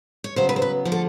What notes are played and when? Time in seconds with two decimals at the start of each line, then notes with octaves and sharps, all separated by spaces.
0.24 C#5
0.36 C#3 F#3 B3 C5
0.49 B4
0.56 C5
0.62 B4
0.85 D3 F3 A3
0.92 A4